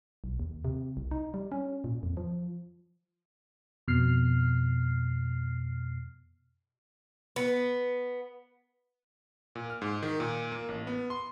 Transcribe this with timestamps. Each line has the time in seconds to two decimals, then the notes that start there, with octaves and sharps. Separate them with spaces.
0.24 B1
0.40 D#2
0.65 C3
0.97 C2
1.11 D#4
1.34 G3
1.52 C#4
1.84 A#2
2.03 F2
2.17 F3
3.88 F2 B2 F6 C7
7.36 B3
9.55 A#2
9.70 F6
9.82 G#2
10.03 D#3
10.20 A#2
10.52 A#3
10.68 A1
10.87 B3
11.10 C6